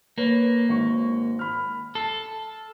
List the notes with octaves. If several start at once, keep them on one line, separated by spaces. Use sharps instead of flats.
A#3 B4 C#5
G#1 C#6
B5 F6
A4 C7